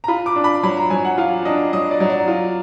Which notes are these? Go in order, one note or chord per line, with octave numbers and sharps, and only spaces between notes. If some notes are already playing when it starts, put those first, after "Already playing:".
A#5
F4 B5
D6
D4
B5
F#3 B5
A#5
F#3 G#5
F#5
F4 F5
D4 D#5
F#3 D#5
D5
F#3
D5
F4